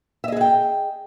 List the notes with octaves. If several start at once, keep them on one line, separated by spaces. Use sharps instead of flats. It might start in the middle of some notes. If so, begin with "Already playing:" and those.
G#4 D#5 E5 F#5 G5